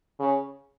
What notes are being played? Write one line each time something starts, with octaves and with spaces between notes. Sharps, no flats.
C#3